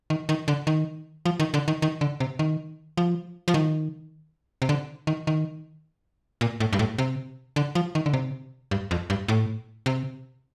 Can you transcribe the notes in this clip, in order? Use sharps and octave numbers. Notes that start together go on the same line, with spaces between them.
D#3
D#3
D3
D#3
F3
D#3
D3
D#3
D#3
D3
C3
D#3
F3
F3
D#3
C3
D3
D#3
D#3
A#2
A2
G2
A2
C3
D3
F3
D#3
D3
C3
G2
F2
G2
A2
C3